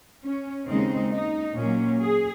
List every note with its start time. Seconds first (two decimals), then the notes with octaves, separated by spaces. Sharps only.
0.23 C#4
0.67 D#2 C#3 G#3 C4 D#4
1.11 D#4
1.55 A#2 F#3 A#3 C#4
2.00 G#4